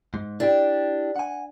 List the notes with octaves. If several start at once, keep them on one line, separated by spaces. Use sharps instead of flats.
G#2
D4 E4 G4 G5
F#5 G#5